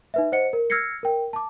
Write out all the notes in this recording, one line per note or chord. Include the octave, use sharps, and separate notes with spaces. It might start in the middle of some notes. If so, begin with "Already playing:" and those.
D#4 B4 E5
C5 D#5 F#5 C#7
A#4
E6 F6 G#6 A#6 C7 C#7
A#4 G5
A5 D6